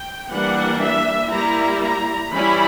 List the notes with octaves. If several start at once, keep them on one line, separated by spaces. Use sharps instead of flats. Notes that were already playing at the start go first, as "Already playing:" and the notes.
Already playing: G5
E3 G3 A#3 D4 F#5
E5
G3 A#3 E4 A#5
A#5
E3 G3 C#4 E4 B5